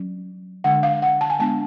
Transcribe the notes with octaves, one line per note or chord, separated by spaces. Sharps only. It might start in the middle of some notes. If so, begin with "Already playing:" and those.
Already playing: F#3 C#4
D3 G#3 D4 F#5
F5
F#5
A5
G#5
G#3 B3 D4 A5